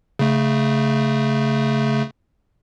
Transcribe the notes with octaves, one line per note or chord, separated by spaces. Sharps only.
C#3 A3